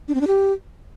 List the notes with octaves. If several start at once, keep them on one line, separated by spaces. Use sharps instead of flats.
D4
C4
D4
G4